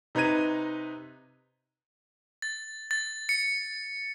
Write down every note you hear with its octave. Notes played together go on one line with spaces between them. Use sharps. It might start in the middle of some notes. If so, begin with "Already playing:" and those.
C3 D#4 B4 A#5 G#6 D#7
A6
A6
C#7